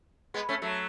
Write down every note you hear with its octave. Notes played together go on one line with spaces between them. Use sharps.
G#3 B3
A3 C#4
F#3 A3